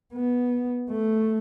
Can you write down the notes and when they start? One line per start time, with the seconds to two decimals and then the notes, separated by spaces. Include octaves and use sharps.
0.14 B3
0.90 A3